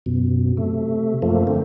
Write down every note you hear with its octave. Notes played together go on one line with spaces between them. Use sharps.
F#2 B2
C3 A3
F#2 F3 A3 A#3
D3 A3 C4